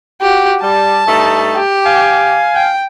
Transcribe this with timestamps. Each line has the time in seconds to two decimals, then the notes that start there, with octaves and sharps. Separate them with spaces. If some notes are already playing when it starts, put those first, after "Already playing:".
0.21 F#4 G4
0.62 G3 A5
1.07 G2 A3 D#4
1.56 G4
1.86 F5 G#5
2.55 G5